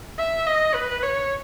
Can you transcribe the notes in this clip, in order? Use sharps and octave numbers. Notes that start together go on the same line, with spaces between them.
E5
D#5
B4
C#5